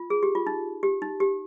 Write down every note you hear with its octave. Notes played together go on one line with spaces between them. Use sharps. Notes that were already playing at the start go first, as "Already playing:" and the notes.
Already playing: F4
G#4
G4
F4
D#4
G4
D#4
G4